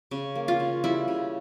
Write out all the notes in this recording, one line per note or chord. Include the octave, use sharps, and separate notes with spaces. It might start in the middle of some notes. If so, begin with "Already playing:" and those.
C#3
A#3
F4
C#3
G3 E4
C#3